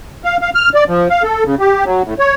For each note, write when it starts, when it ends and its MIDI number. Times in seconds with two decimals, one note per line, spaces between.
0.25 0.37 77
0.41 0.50 77
0.55 0.69 89
0.74 0.84 74
0.88 1.08 53
1.10 1.23 77
1.23 1.44 69
1.45 1.55 49
1.59 1.84 67
1.85 2.02 54
2.05 2.14 45
2.19 2.35 73